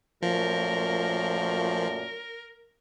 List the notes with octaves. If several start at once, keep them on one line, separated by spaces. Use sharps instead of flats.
F#2 A#2 F3 A3 A#4